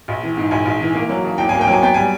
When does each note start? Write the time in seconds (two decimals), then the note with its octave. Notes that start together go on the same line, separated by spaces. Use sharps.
0.08 A#1
0.23 E3
0.37 G#2
0.51 A#1 G#5
0.66 A#1
0.81 E3
0.95 A#3
1.09 F#3
1.24 C#3
1.38 E2 G5
1.49 A#3 G#5
1.61 G5
1.68 F#3 G#5
1.82 B3 G5
1.94 G3 G#5